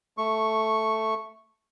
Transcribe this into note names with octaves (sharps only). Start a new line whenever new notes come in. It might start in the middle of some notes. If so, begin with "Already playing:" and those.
A3 C#6